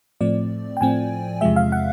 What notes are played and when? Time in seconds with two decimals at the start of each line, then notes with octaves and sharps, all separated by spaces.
0.21 A2 F3 A3 C4 D5
0.77 G5
0.81 A2 F3 A3 C4 G#5
1.41 E2 C3 F3 G#3 E5
1.56 F5
1.72 F#5